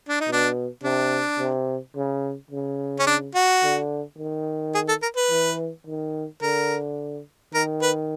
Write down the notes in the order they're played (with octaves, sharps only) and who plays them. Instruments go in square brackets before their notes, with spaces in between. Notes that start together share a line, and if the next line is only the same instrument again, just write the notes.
[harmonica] D4
D#4
[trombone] B2 [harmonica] D4
[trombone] C3 [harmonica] D4
[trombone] C3
C#3
C#3
[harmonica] C#4
D4
F#4
[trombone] D3
D#3
[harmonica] G#4
A4
A#4
B4
[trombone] E3
D#3
[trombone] D3 [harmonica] A#4
[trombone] D#3 [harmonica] A#4
[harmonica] B4